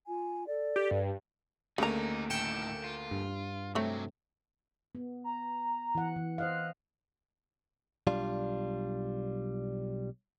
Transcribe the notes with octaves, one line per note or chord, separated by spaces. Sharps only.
F4 G#5
A4 D5
G4
G2
D2 C#3 A3 A#3 D#4 A#5
A2 D#3 G5 C#7 E7
F4
G2
C3 F#3 A3 C4 C#5
B3
A#5
E3 F#5
E3
C5 D#5 F5 F#6
B1 G3 D4 F4